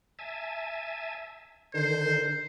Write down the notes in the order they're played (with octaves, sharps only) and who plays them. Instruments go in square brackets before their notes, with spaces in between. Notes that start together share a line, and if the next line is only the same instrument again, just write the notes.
[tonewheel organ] E5 G#5 A5
[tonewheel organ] D3 D#3 [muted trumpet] C5